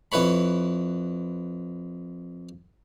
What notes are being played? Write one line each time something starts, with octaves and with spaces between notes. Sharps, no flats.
F2 E4 B4 C#5 B5